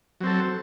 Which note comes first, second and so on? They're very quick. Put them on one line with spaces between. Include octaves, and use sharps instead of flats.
F#3 C4 A4